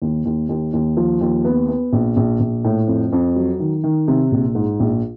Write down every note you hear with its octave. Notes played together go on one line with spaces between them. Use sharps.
D#2
D#2
D#2
D#2
F3
D#2
B3
B3
A#1
A#1
A#1
A2
F2
F2
F#3
D#3
D#3
C3
A#1
G#2
A#1